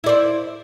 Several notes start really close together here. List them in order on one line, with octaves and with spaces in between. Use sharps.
E4 D5 C5